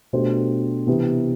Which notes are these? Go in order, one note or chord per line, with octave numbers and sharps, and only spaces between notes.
B2 A3 D4 G4 C5
C3 E3 B3